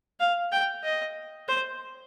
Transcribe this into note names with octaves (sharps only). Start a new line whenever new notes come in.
F5
G5
D#5
C5